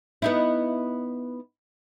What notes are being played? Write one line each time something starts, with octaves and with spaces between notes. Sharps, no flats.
B3 D#4 E4